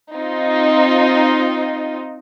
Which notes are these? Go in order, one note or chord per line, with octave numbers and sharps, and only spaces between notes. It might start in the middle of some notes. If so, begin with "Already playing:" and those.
C4 D#4 F4